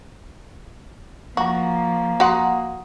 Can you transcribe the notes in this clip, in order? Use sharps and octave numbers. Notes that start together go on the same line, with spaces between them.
F3 A#3 F#4 A#5 C#6
F#4 F#5 A#5 C6 D#6